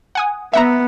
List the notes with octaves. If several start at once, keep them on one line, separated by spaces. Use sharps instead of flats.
F#5 G#5 D#6
B3 E5 F#5 A#5